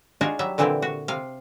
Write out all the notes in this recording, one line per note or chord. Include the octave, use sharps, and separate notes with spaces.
D4 D#4 F4 F#4 G#4
F#3 G3 E5
A#2 D3 E3 C4 E4 G4
F#4
C3 F5